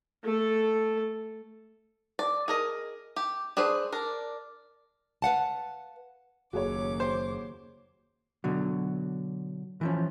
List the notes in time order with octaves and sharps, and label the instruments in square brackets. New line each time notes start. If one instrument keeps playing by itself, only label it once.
[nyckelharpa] A3 A4
[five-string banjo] D5
G#4 A#4 D#5
G4
D4 G#4 B4 C5
D4 A#4
[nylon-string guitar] B4 F5 F#5 A5
[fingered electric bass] F#1 [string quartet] D#2 D6 [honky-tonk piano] F#4 G#4 C#5
[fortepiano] C5
[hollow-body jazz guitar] B2 D3 F#3
E3 F3 C#4